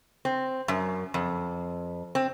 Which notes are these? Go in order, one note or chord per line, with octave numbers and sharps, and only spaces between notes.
C4
F#2
F2
C4